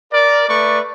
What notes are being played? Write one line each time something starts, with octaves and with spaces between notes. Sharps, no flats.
A#4 D5
A3 B4 D5 C#6